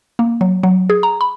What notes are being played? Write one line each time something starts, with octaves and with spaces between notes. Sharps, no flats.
A#3
F#3
F#3
G#4
A#5
B5